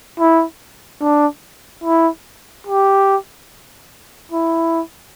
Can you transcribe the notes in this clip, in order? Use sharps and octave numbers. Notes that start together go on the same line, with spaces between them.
E4
D4
E4
G4
E4